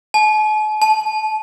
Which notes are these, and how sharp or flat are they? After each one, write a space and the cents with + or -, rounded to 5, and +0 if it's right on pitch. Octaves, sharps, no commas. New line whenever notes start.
A5 -45
A5 -25